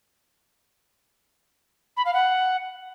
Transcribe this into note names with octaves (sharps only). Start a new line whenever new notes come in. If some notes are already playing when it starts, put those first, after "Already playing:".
B5
F5
F#5